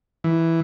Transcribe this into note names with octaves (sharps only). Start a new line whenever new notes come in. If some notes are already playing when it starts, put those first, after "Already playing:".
E3